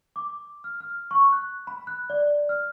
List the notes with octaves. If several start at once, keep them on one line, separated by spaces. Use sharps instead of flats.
D6
F6
F6
C#6
F#6
B5
F#6
D5
F6